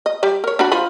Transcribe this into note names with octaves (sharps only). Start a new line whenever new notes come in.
D#5
G3 D5
A#4 C#5
D4 F#4 B5
F3 F4 B5